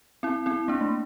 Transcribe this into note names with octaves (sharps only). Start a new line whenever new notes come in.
C4 E4
C4 E4
A#3 D4
A3